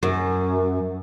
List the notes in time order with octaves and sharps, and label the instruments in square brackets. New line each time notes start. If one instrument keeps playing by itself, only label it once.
[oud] F#2